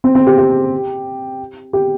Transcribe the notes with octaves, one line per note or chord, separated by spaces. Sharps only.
C4
C4
G4
G4
G4